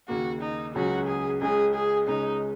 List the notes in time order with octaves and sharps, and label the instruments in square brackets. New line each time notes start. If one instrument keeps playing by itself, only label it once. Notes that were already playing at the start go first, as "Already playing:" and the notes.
[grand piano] D#2 C#3 A#3 [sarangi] F#4
[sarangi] D#4
[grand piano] C#2 C#3 F#3 C#4 G#4 [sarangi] F#4
[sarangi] G#4
[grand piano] C#2 C#3 G#3 C#4 [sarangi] G#4
[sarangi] G#4
[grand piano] C#2 C#3 G#3 C#4 [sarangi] D#4